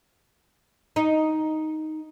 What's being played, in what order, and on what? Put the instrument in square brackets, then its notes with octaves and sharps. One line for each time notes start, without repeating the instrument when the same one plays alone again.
[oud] D#4